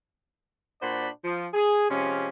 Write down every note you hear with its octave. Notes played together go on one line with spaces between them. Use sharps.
A#2 D4 F#4 C5 D5 B5
F3
G#4
C3 F3 G#3 C#4